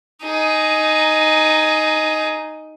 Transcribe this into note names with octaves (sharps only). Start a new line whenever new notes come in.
D#4 G#4